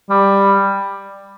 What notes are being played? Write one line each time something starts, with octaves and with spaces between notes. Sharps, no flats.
G3